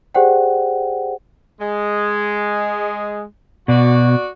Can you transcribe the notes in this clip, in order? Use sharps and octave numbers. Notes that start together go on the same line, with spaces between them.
G4 G#4 C5 D5 F#5 G5
G#3
B2 F#4 D5